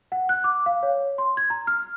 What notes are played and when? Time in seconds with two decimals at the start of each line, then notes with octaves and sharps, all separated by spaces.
0.12 F#5
0.29 F#6
0.44 D6
0.66 F5
0.83 C#5
1.18 C6
1.37 G#6
1.50 A#5
1.67 F6